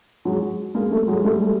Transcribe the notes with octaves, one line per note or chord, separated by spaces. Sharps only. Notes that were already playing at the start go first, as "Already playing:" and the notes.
F#3 G#3
G#3 A#3
G3 A3
F#3 G#3
G3 A3